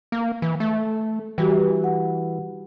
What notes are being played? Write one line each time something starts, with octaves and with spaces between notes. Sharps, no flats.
A#3
E3
A3
E3 G3 F#4 G4
F#5